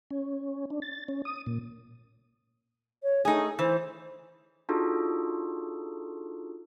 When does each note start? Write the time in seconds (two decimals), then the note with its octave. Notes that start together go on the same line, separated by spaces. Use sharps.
0.11 C#4
0.70 D4
0.82 A6
1.08 C#4
1.25 D#6
1.46 A#2
3.02 C#5
3.25 A3 D#4 G#4
3.59 E3 C5
4.69 D4 D#4 F4 F#4 G#4 A4